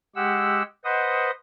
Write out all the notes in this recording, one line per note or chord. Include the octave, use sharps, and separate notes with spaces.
G#3 G4 F#5 E6
B4 C5 D#5 F#5 D#6